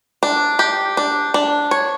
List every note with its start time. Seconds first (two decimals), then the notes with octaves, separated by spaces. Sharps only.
0.23 D4
0.59 G4
0.97 D4
1.34 D4
1.71 C#5